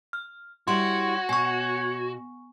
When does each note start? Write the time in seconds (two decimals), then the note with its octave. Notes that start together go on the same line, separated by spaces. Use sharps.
0.13 F6
0.68 G3 E4 F#4 C#5 C6
1.29 B2 C#5 G#5 C#6